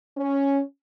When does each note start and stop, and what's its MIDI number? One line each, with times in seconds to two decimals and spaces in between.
0.18 0.61 61